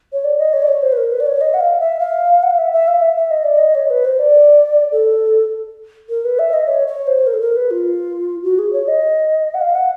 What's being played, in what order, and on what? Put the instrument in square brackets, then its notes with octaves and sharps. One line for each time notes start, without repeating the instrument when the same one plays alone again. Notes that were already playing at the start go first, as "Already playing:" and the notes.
[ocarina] C#5
D5
D#5
C#5
D5
C#5
C5
B4
A#4
B4
D5
C#5
D#5
F#5
F5
E5
F5
F#5
F5
E5
E5
F5
E5
E5
D#5
D5
D#5
C#5
B4
C5
D5
A4
A#4
B4
E5
D#5
C#5
C#5
C5
A#4
A4
A#4
B4
F4
F#4
G#4
C#5
D#5
F#5
F5
F#5